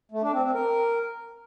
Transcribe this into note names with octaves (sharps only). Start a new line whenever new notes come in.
A3
D4
C4
C4
A#4